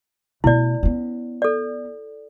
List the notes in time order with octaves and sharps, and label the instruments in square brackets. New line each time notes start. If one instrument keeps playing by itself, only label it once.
[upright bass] B2 A3 [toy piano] E4 D5
[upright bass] B3 C#4
[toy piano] A4 D5